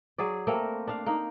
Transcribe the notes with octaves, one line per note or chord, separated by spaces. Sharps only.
F#3 G#4 D5
A3 A#3 C4 A#4
D4 F5
A#3 D#4